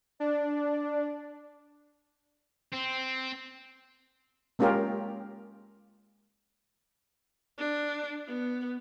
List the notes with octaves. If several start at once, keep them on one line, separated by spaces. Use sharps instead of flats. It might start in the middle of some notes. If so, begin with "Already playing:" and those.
D4 D5
C4
G#3 A#3 C#4 F4 G4 A#4
D4
B3